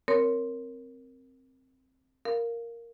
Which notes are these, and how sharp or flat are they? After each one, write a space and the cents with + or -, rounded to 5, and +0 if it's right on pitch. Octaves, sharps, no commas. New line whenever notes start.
C4 +5 A#4 +0 C#5 +0
A#4 +0 F5 +0